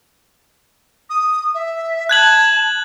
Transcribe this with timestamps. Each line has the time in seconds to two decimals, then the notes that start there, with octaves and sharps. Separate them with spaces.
1.09 D#6
1.54 E5
2.09 A5 F#6 G#6 F#7